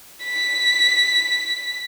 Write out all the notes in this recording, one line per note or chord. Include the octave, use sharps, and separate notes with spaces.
B6